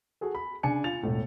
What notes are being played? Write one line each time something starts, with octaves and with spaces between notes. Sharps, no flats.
F#4 G#4 A4
B5
C#3 D4 G#5 C#7
F4 A6 F7
E1 A2